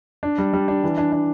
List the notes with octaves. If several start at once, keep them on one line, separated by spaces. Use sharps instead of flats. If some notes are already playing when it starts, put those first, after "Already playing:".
D4
G3
G3
D4
E3
D4
D4